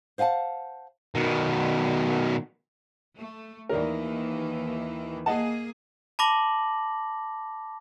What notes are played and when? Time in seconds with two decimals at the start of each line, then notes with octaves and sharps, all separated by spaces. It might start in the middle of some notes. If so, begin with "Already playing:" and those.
0.18 C5 F5 F#5 G#5 A5
1.15 B2 D#3
3.17 A3
3.69 D#2 D#3 E3 A#4 D5
5.26 A#3 G#4 D#5 F#5 A5
6.19 A5 B5 D6 A#6 F#7